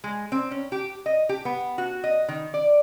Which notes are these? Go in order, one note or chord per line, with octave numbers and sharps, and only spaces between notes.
G#3
C4
C#4
G4
D#5
G4
B3
F#4
D#5
D#3
D5